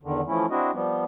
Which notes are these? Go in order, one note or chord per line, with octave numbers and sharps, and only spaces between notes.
E2 D3 D#3
E3 F3 A3 C#4 E4
C4 D4 E4 F#4 D#5
F3 G3 B3